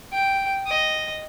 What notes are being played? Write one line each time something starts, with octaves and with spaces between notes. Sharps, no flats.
G5
D#5